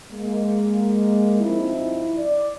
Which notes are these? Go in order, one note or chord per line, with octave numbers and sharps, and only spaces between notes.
G#3 A#3
G2 F3 C4 D#4 E4
D5